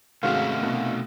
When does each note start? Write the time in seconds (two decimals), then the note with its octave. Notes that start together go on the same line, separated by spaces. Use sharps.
0.23 G#2 C3 D#3 A3 C#4 F#4 F5
0.63 B2